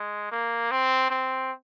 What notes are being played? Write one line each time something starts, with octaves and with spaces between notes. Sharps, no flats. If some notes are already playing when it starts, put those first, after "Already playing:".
Already playing: G#3
A#3
C4
C4